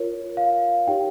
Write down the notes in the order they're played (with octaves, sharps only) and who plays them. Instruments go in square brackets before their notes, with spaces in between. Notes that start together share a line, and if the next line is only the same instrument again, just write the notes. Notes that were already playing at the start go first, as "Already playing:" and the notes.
Already playing: [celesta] F4 A#4 C#5
F5
D#4 G4 C#5 G5